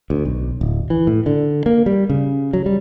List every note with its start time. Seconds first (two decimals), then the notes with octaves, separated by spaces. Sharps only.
0.10 D2
0.25 B1
0.61 D1
0.90 E3
1.07 A2
1.26 D3
1.66 A#3
1.86 G3
2.09 C#3
2.53 F#3
2.66 G3